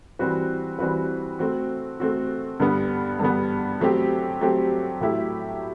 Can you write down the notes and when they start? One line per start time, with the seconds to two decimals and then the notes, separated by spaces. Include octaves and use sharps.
0.19 E3 G3 C4 F#4 B4
0.79 E3 G3 C4 F#4 B4
1.39 A3 C4 F#4
2.00 A3 C4 F#4
2.60 G2 D3 G3 B3
3.19 G2 D3 G3 B3
3.81 F#3 A3 C4 G4
4.41 F#3 A3 C4 G4
5.01 A2 F#3 A3 E4 G4